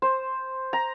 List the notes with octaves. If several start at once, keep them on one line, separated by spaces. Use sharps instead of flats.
C5
A#5